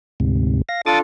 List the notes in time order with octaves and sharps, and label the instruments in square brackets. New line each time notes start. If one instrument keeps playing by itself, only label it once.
[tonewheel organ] D2 G#2 C3
F5 A#6
[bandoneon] D4 F4 A4 [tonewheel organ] D6 D#6 A6